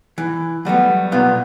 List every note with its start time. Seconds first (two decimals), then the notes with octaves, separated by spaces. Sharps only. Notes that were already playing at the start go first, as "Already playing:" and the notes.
0.18 E3
0.65 F#3 G3 A3 B3
1.12 B1 A#2 B3 F5